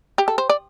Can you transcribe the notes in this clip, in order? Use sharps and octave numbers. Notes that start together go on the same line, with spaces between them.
G4
A4
C5
D5